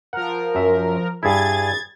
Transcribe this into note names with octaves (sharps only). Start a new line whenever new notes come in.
F3 A#4 F#5
F#2 E5
G2 E4 G#4 G#6 A6